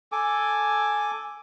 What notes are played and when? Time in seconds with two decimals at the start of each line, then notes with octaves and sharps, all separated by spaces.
0.12 A4 G#5 D6